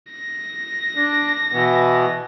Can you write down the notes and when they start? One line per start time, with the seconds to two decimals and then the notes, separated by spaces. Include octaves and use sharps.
0.11 A#6
0.96 D4
1.53 B2 E3 B3